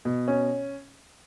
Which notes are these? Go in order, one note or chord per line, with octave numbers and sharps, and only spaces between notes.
B2
C#4